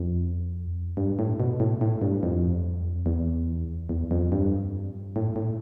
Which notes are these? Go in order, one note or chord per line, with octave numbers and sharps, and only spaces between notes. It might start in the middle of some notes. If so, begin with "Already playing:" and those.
Already playing: F2
G2
A2
B2
A2
A2
G2
F2
E2
E2
F2
G2
A2
A2